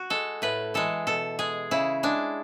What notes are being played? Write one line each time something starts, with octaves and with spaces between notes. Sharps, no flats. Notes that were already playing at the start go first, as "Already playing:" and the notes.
Already playing: F#4
G#3 A4
A2 B4
E3 G#3 A4
B2 A4
G#3 G#4
C#3 E4
G#3 D4